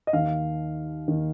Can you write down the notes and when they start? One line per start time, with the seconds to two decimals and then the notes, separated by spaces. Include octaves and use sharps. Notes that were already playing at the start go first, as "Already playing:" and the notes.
0.07 D#5
0.13 D#2 D#3 F5
1.08 D#2 D#3